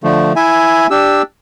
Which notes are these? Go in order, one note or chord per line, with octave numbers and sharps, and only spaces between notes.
D3 F3 A3
E4 E5 G#5
D4 G4 E6